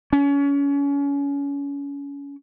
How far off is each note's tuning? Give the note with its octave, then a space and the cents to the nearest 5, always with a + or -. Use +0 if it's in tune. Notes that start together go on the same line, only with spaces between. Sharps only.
C#4 +30